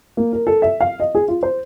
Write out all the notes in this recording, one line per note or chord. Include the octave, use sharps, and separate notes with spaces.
A#3
A#4
A4
E5
F5
D#5
G#4
F4
C5